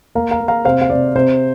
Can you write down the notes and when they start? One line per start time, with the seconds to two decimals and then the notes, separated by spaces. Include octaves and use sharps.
0.15 A#3 F5 A#5
0.31 F5 A#5
0.40 A#3
0.48 F5 A#5
0.65 C3 C5 F5
0.81 F5
0.90 C3 D5
1.15 C3 C5